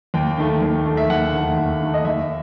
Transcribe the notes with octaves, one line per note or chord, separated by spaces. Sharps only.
D#2 G5
D#3 A3
D#2
D#3 A3
E5
D#2 F#5
D#3 A3
D#2
D#3 A3
D#5
D#2 E5